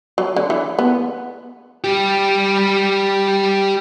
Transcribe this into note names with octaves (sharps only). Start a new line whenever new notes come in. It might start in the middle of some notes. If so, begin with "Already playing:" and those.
F#3
D3
E3
B3
G3 G4